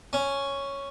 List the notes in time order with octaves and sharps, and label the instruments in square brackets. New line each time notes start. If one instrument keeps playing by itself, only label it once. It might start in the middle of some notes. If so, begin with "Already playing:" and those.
[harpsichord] C#4